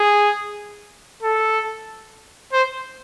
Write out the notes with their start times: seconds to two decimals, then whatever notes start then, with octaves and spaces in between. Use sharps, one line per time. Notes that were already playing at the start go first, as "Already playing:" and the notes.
Already playing: G#4
1.22 A4
2.53 C5